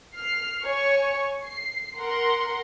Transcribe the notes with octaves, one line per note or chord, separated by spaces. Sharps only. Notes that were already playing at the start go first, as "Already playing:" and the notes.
F6 C7
C#5 G#5 C#6
C7
A#4 F#5 C6